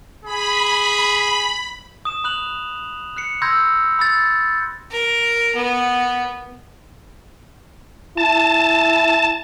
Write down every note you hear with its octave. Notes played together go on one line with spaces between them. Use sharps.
G#4 B5
D#6 E7
B5 D#6 F#6 F7 F#7
F#6 C7 C#7
B5 C6 E6 G6 G#6 A#6
B5 E6 A6
A#4
B3
E4 A5